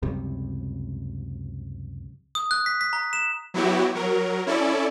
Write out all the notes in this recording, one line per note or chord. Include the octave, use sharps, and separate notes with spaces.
C#2 F#2 C3 G3
D#6
F#6
B6
B6
A#5
E7
F#3 B3 E4 F#4 G4
F#3 A#4
C#4 E4 A4 D5